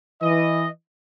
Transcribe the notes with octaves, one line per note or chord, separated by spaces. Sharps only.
E3 D#5